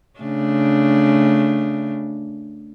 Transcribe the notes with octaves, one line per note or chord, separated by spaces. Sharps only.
C#3 A3 D4